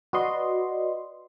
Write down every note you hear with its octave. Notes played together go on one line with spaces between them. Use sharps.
F#4 B4 D5 D#5 C6